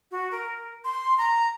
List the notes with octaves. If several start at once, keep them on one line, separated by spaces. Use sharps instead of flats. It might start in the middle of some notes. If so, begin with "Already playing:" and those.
F#4
A#4
C6
A#5